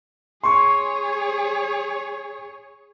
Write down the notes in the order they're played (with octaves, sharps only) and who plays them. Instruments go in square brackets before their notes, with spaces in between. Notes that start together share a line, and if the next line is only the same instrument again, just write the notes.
[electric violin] G#4 C#5 [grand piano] C6 C#6